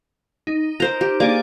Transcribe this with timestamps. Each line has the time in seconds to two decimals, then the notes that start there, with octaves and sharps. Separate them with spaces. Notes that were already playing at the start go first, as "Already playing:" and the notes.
0.47 D#4
0.80 A#4 C5 A#5
1.01 G4
1.20 A#3 D4 G#4 D5